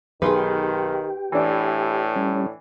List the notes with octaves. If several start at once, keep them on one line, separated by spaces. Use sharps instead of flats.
B1 D#3 G4 G#4 B4 C6
A2 E3 D4
G3 C#4